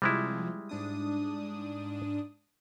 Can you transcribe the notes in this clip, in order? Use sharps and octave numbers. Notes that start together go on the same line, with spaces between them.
C3 F3 G3 G#3 E4
G#2 D4 D#6